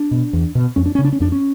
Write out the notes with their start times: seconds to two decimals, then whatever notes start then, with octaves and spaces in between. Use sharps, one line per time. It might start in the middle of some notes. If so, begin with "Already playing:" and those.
Already playing: D4
0.11 B2
0.33 E2
0.55 B2
0.76 F2 C#4
0.86 D4
0.95 C#3 C#4
1.04 D4
1.12 C#4
1.20 F2 D4
1.32 C#4